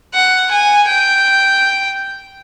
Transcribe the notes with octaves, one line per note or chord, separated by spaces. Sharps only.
F#5
G#5
G5